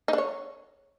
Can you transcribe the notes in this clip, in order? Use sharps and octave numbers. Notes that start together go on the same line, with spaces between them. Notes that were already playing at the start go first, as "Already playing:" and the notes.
D#4
D4
C#5